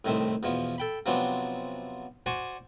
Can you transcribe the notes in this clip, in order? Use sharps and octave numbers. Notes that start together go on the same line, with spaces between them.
C2 A2 D#3 C4 E5
E2 B2 F3
A4 G5 B5
C3 F3 F#3 B3 C4 D4
F#4 C5 D5 G#5 C#6